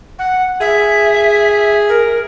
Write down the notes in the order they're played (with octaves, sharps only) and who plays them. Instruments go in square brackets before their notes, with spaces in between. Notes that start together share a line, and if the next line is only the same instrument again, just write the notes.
[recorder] F#5
[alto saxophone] G#4 [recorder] E5
[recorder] A#4